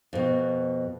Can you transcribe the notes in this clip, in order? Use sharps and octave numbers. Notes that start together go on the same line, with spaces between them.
F2 B2